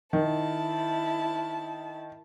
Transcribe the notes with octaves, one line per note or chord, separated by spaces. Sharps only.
D#3 E4 A5